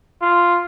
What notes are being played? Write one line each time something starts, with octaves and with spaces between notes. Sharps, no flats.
F4